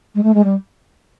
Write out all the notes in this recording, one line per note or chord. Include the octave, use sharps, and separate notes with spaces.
G#3
A3
G#3
G3